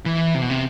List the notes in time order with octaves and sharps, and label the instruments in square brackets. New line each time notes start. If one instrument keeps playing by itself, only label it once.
[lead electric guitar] E3
C3
B2
C3